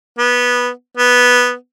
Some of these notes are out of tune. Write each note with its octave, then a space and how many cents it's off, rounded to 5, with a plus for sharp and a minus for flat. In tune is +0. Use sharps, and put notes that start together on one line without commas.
B3 -10
B3 -5